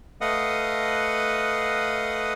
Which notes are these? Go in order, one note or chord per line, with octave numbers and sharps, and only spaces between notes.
A3 B4 D#5 F5 F#5 D#6